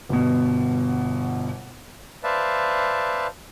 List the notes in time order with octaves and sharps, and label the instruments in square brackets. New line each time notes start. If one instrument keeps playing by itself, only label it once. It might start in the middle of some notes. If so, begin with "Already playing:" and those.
[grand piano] G1 B2
[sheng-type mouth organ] B4 C5 D5 E5 F5 A5